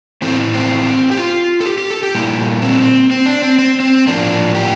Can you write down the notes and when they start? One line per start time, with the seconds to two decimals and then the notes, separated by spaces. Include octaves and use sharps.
0.22 A2 E3 A3 C4
0.54 C4
1.11 G4
1.18 F4
1.60 A4
1.66 G4
1.78 G4
1.90 A4
2.03 G4
2.15 A#2 G3 A#3 E4
2.62 C4
3.11 C4
3.26 D4
3.42 C4
3.59 C4
3.80 C4
4.07 A2 F3 A#3 D4
4.55 G4